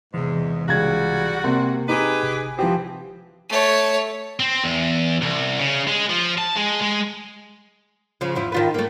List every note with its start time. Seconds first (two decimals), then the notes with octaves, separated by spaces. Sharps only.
0.14 E2 G#2 C3 E3
0.68 C#2 G3 F#4 G#6
1.44 C3 A#3 C4 A#4
1.89 D#4 G4 G#4 B4
2.23 G1 C3 G#5
2.59 E3 F3 B3 C4 G4
3.49 A3 C#5
4.40 C4
4.64 E2
5.22 C2
5.59 C#3
5.87 G#3
6.09 F3
6.38 A5
6.56 G#3
6.81 G#3
8.21 C#3 F3
8.35 E2 F3 E4
8.52 D#3 F4 B4
8.74 A3 A#3